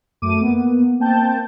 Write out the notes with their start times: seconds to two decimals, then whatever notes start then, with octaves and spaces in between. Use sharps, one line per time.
0.22 F#2 A3 D6 D#7
0.41 A#3 B3
0.99 A#3 C4 G5 A5 G6